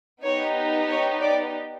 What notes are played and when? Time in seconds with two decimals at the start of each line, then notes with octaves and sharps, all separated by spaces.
0.24 B3 D#4 G4 C#5
0.89 C#5
1.21 D5